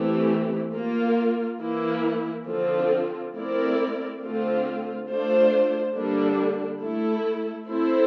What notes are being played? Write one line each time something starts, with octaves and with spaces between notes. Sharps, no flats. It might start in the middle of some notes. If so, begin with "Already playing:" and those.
Already playing: E3 A3 C4 G4
A#3 F4 A#4
E3 A#3 E4
D3 F3 C4 F4 A4
A3 C4 E4 A#4 D5
D3 A3 C4 F4
A3 D4 F4 C5
D3 G3 A#3 D4
A3 E4 A4
C4 E4 A4 C5